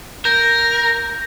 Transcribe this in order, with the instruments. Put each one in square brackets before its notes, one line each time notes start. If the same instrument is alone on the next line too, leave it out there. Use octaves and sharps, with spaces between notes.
[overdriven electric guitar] A#4 [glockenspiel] G6